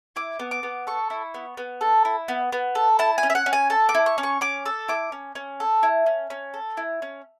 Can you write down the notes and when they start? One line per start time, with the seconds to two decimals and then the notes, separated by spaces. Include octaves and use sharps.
0.16 E4 D6
0.39 B3
0.51 D6
0.63 B3
0.87 A4 C#6
1.10 E4
1.34 B3
1.57 B3
1.81 A4
2.05 E4
2.28 B3
2.52 B3
2.75 A4
2.99 E4 A5
3.18 G#5
3.23 C#4
3.30 E5
3.35 F#5
3.46 C#4
3.53 G#5
3.70 A4 A5
3.89 D6
3.95 E4
4.06 C#6
4.18 C#4
4.23 C#6
4.41 C#4 D6
4.65 A4 E6
4.88 E4 D6
5.12 C#4
5.35 C#4
5.60 A4
5.83 E4
6.06 C#4
6.30 C#4
6.54 A4
6.77 E4
7.02 C#4